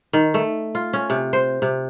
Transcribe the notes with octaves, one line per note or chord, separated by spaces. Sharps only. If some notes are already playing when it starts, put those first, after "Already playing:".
D#3
A3
F4
C#4
C3
C5
C3